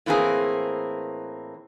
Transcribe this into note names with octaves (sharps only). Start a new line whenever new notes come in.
A2 E3 A#3 C4 G#4